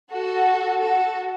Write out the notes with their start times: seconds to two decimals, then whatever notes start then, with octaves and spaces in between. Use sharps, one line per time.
0.10 F#4 A4
0.81 F#4 A4